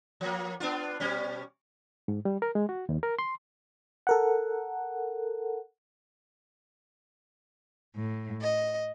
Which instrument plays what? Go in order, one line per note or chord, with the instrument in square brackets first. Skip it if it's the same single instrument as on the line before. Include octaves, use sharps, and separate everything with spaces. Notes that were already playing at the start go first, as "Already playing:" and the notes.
[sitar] F3 A#3
B3 D4 F4
B2 G3 C#4
[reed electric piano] G#2
G3
A#4
G#3
F#4
D#2
A#4
C6
[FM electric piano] A4 A#4 F#5
[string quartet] A2
D#5